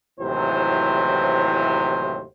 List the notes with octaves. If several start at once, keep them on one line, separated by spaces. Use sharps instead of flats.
D#2 A2 C3 E3 F#3 C5